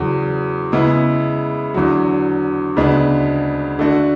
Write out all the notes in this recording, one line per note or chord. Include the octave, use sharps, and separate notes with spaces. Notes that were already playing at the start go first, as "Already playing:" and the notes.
Already playing: E2 C#3 F#3
C#3 G#3 B3 E4
E2 D3 F#3
D2 C#3 G#3 B3 D4
D3 A3 D4 F#4